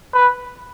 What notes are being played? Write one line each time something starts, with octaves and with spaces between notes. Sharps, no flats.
B4